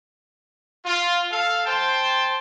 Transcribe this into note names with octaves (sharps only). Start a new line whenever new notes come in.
F4
A4 F5
C5 G5 A5 C6